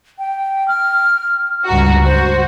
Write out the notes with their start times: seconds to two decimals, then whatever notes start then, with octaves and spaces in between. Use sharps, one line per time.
0.19 G5
0.68 F6
1.68 C#2 G2 F#4 A#5
2.05 F#4 C5